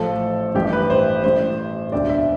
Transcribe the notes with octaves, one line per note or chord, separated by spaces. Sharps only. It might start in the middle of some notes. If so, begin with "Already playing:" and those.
Already playing: A1 A2 F3 A3 A4
A1 G2 E3 A3 G4
B4
C5
A1 A2 G3 C5
E1 D2 D3 D5
E5